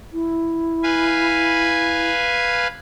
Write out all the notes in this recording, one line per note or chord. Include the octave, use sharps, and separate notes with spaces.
E4
B4 F5 G#5